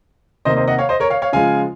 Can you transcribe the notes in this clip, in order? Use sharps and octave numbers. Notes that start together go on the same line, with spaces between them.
C3 D#3 A#3 C5 D#5
C5 D#5
D#5 F#5
C#5 F5
C5 D#5
A#4 C#5
C#5 F5
C#5 F5
C#3 F3 G#3 F5 G#5